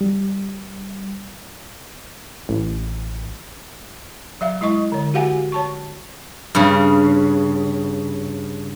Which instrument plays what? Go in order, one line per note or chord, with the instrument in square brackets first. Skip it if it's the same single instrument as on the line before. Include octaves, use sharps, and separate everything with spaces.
[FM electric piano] G3
[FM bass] A1
[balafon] F#3 E5 F5
G#3 E4 D#5 C#6
D3 C#5
F#4 G4 F5 F#5 G#5
C#5 A5 C#6
[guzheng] G2 C#3